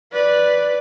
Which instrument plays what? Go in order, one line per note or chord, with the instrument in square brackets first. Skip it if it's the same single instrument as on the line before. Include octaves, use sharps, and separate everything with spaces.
[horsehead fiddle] B4 D5